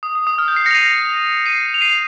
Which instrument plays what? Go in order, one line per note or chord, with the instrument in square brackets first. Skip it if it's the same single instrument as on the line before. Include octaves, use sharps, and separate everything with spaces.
[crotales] D#6
D#6
D#6
F6
G6
C7
A#6 C#7
F7
C7 D#7
C7 D#7
F7
C7 D#7